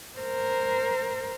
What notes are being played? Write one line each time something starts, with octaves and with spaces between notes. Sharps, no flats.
A#4 C5